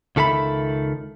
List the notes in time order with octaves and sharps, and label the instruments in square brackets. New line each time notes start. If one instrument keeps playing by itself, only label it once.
[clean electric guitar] C#2 D#3 A4 E5 B5